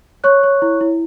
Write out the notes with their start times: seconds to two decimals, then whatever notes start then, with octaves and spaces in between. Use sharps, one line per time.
0.24 C#5 C#6 F#6
0.43 C#5
0.62 E4
0.81 E4